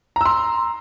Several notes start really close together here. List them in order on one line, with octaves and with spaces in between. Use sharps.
A#5 E6 C6